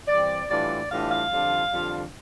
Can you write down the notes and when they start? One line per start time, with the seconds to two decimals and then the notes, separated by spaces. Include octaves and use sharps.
0.08 G2 E3 G3 C4 D5
0.49 A2 E3 G3 D4 F4 D5
0.90 A2 E3 G3 D4 F4 F5
1.10 F5
1.31 F2 D3 G3 D4 F4
1.71 F2 D3 G3 D4 F4